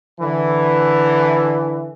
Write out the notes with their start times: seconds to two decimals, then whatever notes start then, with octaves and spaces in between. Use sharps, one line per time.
0.20 D3 E3